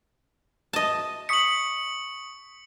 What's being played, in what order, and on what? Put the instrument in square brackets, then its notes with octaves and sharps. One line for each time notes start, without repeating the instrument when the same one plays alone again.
[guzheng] D#5 A5
[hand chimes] C#6 D#6 B6 [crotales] C#7 F#7